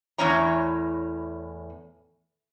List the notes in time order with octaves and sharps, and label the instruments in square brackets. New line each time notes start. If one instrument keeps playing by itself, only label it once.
[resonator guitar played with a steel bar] E2 A2 E3 C#4 C#5 A#5